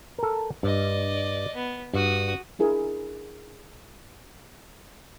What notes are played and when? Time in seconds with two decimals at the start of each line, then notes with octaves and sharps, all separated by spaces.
0.18 A4 A#4
0.63 G2 D5 D#5
1.55 B3
1.94 G2 F#4 D#6
2.59 D4 E4 G#4 A#4